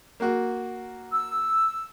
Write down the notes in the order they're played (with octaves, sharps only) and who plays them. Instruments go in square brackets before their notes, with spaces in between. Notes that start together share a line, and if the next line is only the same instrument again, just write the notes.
[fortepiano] A#3 F#4
[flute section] E6